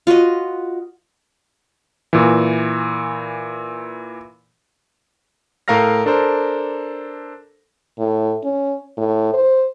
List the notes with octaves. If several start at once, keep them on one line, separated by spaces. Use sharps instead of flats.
F4 F#4 B4 D#5
A#2 E3
A2 A4 A#4 F5 F6 A#6
D4 A4 A#4 C5
A2
C#4
A2
C5